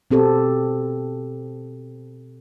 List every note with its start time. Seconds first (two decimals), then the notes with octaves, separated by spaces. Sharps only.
0.11 B2 C4 G4 A4